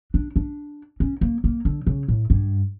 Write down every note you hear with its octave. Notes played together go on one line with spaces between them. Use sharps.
D4
D4
C#4
A#3
A#3
D3
C#3
A2
G2